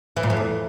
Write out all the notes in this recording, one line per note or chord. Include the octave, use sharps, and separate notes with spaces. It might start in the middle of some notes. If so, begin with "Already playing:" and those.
E3
A#2
F2
E2